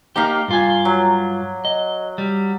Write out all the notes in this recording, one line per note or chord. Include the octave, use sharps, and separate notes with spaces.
A#3 D#4 G4 F5 A#5 D6
G2 F4 G#5
F#3
D#5
G3